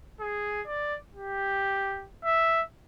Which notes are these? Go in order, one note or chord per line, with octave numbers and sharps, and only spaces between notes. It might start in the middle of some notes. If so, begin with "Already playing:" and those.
G#4
D5
G4
E5